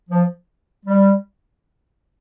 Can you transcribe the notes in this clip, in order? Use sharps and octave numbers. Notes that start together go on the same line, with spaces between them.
F3
G3